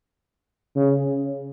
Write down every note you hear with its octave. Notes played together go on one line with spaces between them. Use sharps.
C#3